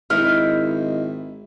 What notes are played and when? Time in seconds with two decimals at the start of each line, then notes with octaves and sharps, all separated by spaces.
0.10 G#1 D#4 E4 A#4 E5